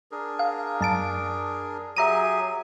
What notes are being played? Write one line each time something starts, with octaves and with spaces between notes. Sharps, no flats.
D4 G#4 A#4
F5
F#2 A5 D7
F#3 G4 G#4 E5 A#5 D#7